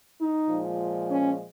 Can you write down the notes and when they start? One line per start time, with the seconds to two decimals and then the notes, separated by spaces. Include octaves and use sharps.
0.19 D#4
0.49 A#2 F3 G#3
1.10 C#4